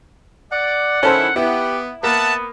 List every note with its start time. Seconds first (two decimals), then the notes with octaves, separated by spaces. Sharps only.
0.52 D5 F#5
1.03 D#3 F#3 C#4 E4 A4 C5
1.36 B3 E4 G4
2.03 A#3 B3 E5 F#5 A5